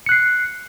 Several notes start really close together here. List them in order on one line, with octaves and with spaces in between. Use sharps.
C#7 F#6 C7